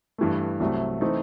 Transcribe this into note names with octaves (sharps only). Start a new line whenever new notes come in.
G2 E3 A3
C2 C3 F#3 A3
E3 A3 C4 D#4